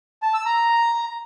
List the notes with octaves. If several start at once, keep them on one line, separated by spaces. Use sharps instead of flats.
A5
E6
A#5